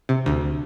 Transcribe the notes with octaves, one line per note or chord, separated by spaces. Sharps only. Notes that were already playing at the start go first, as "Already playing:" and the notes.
C3
D2